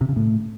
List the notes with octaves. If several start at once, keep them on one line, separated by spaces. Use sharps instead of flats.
C3
C#3
A2